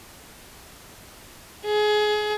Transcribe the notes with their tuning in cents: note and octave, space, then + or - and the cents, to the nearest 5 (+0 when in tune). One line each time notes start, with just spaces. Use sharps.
G#4 +25